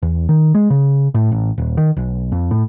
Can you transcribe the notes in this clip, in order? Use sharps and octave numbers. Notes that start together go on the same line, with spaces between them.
E2
D#3
G#3
C#3
A2
A1
D#1
D#3
B1
F2
A2